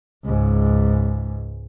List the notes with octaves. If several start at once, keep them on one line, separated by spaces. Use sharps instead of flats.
C#2 G#2